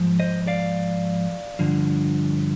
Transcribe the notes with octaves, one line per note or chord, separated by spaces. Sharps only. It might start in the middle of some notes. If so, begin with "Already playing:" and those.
Already playing: G#2 F3
C5 D#5
D5 F5
G2 D3 F3